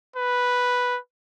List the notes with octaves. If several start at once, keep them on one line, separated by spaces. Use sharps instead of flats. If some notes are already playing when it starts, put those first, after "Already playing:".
B4